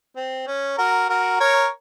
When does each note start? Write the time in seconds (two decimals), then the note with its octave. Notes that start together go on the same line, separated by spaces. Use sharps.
0.16 C4
0.47 C#4
0.78 F#4 A#4
1.09 F#4 A#4
1.40 A#4 C#5